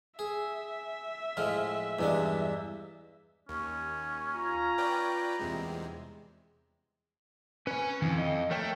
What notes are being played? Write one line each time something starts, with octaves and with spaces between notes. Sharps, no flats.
G#4 E5
A2 F3 G#3 F6
E2 G2 E3 G#3 D4
D#2 C#4
F4 A#5
B4 D5 G5
A#1 E2 C3 G3 G#3
C#4 B4 G#5
F2 D#3 E3
D#5
A3 A#4 C#5 G5